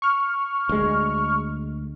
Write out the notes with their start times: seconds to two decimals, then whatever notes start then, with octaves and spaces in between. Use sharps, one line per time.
0.02 C#6 F6
0.69 D2 G#3